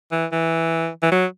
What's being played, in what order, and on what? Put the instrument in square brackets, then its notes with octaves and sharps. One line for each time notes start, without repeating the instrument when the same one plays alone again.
[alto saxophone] E3
E3
E3
F#3